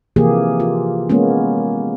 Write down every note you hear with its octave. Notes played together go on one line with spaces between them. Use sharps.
C3 E3 F3 A#3 G4 G#4
F4
G#3 A#3 B3 C#4